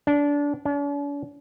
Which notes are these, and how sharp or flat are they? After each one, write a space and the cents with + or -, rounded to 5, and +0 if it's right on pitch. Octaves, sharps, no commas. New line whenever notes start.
D4 -20
D4 -45